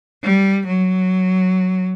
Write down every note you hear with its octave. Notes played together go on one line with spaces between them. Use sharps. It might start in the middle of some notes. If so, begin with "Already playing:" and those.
G3
F#3